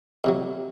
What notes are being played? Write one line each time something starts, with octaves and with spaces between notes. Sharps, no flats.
F2 C3 F#3